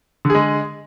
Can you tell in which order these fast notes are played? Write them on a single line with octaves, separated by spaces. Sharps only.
D3 G#4 G#3